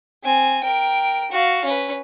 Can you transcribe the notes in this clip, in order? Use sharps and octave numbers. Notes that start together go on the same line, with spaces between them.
C4 G#5
A#4 G5
F#4 F5
C#4 B4